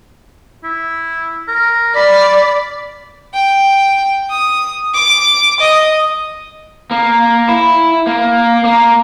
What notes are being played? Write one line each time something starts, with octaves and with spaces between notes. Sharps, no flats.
E4
A#4
D5 B5
G5
D#6
D6
D#5
A#3
E4
A#3
A#3